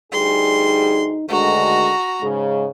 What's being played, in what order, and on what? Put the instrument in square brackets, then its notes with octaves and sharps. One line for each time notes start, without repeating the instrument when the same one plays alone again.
[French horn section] D2 G3 G#4 [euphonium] D#4 [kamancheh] C6
[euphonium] D2 [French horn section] D3 D#3 G#3 [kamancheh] F#4 A#5
[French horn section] G#2 C#3 [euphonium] G#3